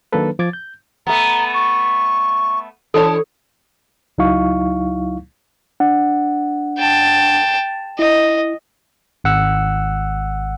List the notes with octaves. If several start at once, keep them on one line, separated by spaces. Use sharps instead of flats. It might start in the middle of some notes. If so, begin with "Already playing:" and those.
D#3 F#3 A#3 D4 A4 B4
F3 D6 G#6 A6
G6
A3 B3 A#5
C#6
E3 D4 A4 C#5 A5
C#2 F#3 D#4 E4 F5 C#6
D4 F#5
G5 A5
E4 D#5
G#1 F#5 E6